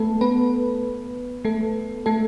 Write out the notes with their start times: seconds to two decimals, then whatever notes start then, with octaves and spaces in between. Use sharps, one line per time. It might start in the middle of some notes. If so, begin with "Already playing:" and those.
Already playing: A3 B3 A4 B4
0.21 B3 B4
1.45 A3 A4
2.06 A3 A4